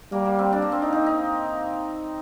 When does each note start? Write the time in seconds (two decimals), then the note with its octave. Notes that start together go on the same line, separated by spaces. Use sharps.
0.12 G3 A#3
0.25 A#3
0.39 C4
0.53 D4
0.62 A#3
0.72 C4
0.82 D#4
0.93 D#4
1.06 D#4